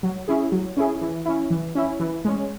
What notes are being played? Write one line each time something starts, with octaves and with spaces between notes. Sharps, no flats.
F#3
C#4 E4 G#4
F#3
C#4 E4 G#4
E3
C#4 E4
E3
C#4 E4
E3
G#3 C#4